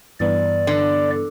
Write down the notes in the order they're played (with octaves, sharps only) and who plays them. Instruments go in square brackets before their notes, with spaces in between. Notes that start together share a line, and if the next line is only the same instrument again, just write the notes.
[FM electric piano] G2 E3 B3 [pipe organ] D5
[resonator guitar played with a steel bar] D3